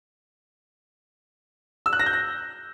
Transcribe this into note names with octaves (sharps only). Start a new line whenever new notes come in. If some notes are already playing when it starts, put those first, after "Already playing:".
E6
F#6
A#6
G6
A#6